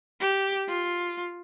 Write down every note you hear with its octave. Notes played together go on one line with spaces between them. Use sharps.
G4
F4